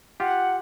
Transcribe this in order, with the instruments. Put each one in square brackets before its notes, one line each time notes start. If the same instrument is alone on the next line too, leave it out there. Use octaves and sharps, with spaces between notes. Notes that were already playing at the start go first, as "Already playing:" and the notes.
[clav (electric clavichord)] F4 G4 [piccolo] F#5